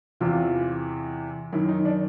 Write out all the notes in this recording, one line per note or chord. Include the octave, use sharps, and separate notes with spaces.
E2 C3 E3 F4
F#2 D#3 E4
D#4
D4